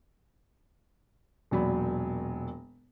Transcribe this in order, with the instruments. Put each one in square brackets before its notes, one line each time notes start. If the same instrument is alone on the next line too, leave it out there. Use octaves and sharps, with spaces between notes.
[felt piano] E1 A#2 F#3 D5 B5